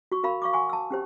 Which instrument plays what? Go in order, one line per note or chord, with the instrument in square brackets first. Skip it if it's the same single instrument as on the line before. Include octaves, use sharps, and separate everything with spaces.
[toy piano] F#4 C#6
F#4 A#4 F5 B5
F5 C#6 D6
F#5 G#5 C6 C#6
A5 E6
C#4 G4 C5